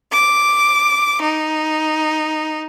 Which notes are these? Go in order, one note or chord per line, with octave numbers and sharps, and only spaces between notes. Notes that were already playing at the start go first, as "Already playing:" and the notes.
D6
D#4